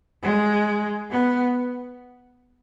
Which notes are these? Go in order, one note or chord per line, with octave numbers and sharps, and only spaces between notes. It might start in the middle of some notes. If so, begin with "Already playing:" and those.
G#3
B3